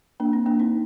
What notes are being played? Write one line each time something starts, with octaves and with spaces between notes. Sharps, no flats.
A#3 D4
C4
A#3 D4
C4 D#4